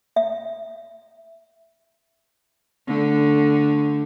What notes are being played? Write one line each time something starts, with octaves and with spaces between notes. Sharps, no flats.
E5
D3 A3